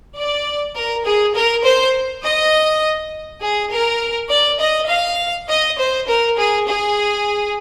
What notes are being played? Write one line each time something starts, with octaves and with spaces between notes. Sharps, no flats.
D5
A#4
G#4
A#4
C5
D#5
G#4
A#4
D5
D#5
F5
D#5
C5
A#4
G#4
G#4